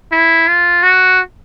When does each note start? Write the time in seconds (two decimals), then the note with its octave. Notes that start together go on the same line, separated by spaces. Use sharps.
0.12 E4
0.48 F4
0.83 F#4